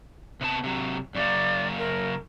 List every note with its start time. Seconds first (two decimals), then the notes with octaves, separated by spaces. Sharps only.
0.41 C3 B3 A5
0.64 C3 F#3
1.15 F#2 C#3 A#3 D5
1.78 A#4